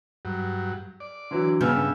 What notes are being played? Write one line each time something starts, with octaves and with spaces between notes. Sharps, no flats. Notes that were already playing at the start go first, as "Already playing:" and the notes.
G2 F#3
D5
D3 E3 F#3
G2 C#3 B3 E5 G#5 F6 G6